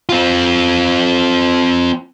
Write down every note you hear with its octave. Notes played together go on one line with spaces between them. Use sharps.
C4 F4